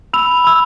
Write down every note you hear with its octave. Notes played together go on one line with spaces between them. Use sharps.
B5 E6 F7
B5 E6